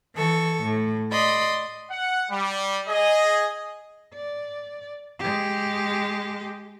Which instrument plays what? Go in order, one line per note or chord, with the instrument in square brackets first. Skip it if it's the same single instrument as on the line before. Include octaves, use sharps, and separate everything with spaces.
[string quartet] E3 A4 C#6
A2
D5 D#5 B5 C6
[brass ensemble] F#5
G3
G#4 D#5
[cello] D5
G#3 G4